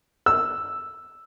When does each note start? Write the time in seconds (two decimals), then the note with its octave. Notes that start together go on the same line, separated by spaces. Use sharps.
0.26 E6